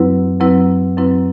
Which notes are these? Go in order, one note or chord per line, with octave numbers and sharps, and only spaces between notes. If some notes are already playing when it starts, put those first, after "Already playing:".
Already playing: F#2 F#3 C4 E4 B4
F#2 F#3 C4 E4 B4
F#2 F#3 C4 E4 B4